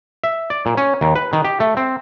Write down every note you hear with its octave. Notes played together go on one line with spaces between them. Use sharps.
E5
D5
A#2
C#4
D#2
B4
D#3
G4
A3
C4